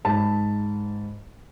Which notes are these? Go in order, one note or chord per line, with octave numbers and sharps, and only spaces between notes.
G#2 A5 B5